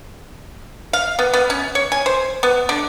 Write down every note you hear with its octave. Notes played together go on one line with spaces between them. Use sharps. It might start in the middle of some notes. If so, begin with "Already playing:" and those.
F5
B3
B3
C#4
C#5
G#5
C5
B3
D3